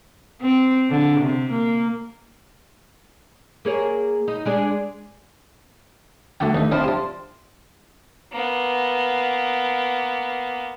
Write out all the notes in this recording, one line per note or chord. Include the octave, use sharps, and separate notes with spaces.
C4
D3
C3
A#3
A#3 G#4 C#5
D#4
G#3 D4 G#4
D3 A3 F#4 G5
D#2 A3 D#4
F3 C4 D4 E4 C5
D4 G4
A#3 B3